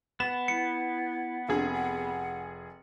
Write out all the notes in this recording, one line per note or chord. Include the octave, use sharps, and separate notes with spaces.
B3 E7
E4 C#7
F1 D4 G#4
F#5